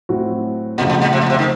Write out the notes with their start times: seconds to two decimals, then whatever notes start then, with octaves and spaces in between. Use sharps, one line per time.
0.09 A2 F#3 C4 F#4
0.78 F2 A#2 C#3 F#3 A3
0.89 A#2
1.02 A#2
1.13 C3
1.21 A#2
1.30 C3
1.39 D#3